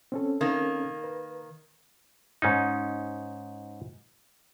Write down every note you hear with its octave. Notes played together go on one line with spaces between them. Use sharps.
C4 C#4 A4
D#3 A#3
B4
G#2 C#4 D#4